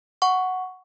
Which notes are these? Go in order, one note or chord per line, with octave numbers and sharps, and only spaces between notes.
F#5 C#6